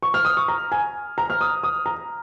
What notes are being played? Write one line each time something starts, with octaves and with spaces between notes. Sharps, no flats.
C#6
F6
D#6
C#6
A#5
G#5
A#5
F6
D#6
D#6
A#5